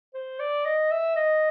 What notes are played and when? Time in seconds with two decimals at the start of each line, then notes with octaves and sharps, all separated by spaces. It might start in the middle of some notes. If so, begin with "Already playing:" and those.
0.14 C5
0.40 D5
0.66 D#5
0.91 E5
1.16 D#5